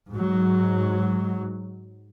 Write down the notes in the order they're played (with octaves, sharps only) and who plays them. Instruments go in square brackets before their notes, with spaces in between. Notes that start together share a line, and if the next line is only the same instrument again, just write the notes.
[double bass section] G#2 F#3